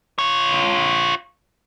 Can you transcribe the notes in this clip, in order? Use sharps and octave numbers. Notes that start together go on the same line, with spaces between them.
F4 C#5